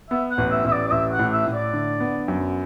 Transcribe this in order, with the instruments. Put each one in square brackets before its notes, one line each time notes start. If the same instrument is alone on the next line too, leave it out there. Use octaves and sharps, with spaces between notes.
[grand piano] B3 [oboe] E5
[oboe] F#5
[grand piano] A1
[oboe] E5
[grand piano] A1 [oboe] E5
[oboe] D5
D5
[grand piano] A1 [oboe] E5
[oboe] F#5
[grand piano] A2
[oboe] E5
[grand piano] A2
[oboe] D5
[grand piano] D3
B3
F#2